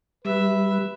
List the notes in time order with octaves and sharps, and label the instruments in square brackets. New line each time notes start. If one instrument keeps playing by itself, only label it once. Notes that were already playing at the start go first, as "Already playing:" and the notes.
[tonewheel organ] G3 [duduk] B4 [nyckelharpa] E5